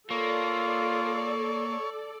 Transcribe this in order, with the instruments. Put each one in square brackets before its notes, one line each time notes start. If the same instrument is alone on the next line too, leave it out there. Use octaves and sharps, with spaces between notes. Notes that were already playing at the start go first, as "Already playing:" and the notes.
[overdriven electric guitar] A#3 [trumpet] F4 [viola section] A4 D5 [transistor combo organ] C#5